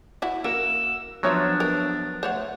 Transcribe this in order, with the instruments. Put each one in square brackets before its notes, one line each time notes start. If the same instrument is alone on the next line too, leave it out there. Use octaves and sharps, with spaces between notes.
[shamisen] E4 F#4
[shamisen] A#3 [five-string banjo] F#4 A#4 [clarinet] E6
[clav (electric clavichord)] F3 F#3 [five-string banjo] B3 C#5 E5 [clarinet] D4
[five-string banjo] B3 [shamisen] A#4
[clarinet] A3 [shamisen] C5 C#5 F#5